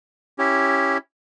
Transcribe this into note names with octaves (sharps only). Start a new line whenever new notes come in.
C#4 E4 G4